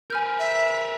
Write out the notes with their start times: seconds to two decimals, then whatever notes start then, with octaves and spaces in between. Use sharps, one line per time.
0.10 A#4 B4 G#5 F6 G6
0.39 E5